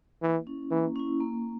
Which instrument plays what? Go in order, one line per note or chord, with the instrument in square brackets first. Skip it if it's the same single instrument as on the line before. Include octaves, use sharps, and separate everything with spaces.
[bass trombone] E3 [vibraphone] A#3
[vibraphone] C#4 E4
[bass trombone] E3 [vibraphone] A#3
[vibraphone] C#4 E4
A#3